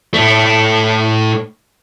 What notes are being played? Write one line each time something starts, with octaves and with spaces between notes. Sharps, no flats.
A2 A3